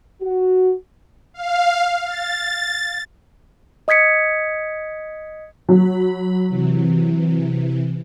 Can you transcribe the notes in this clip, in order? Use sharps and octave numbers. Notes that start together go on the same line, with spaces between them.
F#4
F5
A6
D#5 D#6 G#6 B6 C#7
F#3 B5
C3 E3